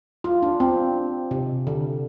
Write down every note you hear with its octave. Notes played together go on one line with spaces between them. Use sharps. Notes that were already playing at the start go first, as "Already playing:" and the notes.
F4
D4
C4
C3
D3